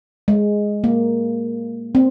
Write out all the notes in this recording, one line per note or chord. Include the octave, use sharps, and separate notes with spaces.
G#3
A#3
C4